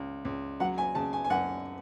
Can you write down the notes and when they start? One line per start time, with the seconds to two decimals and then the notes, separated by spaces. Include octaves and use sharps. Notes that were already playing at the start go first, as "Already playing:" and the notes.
Already playing: C#2
0.25 C#2
0.60 F#3 F#5
0.78 G#5
0.95 C#3 A5
1.13 G#5
1.24 G#5
1.30 F#2 F#5